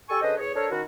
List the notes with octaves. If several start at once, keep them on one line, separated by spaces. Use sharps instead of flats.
G4 A4 G#5 C#6
D3 C#4 G#4 B4 C5 D#5
E2 G#4 C#5
D4 A4 A#4 C5 C#5
D#3 C#4 E4 F#4